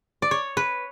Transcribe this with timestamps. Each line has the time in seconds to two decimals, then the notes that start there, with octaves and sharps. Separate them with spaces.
0.22 D5
0.31 C#5
0.57 B4